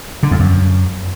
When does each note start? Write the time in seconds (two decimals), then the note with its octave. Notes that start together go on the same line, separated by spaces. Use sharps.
0.23 D3
0.31 F2
0.40 F#2